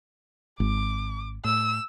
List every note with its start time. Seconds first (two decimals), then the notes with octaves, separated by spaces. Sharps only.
0.60 G#1 D6
1.44 A2 E6